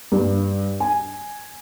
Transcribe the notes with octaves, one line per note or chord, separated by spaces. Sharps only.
G2
G#5